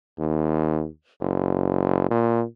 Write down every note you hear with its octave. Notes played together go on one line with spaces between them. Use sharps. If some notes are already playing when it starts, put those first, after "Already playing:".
D#2
F#1
A#2